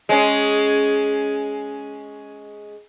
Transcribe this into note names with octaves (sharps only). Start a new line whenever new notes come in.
G#3 C#4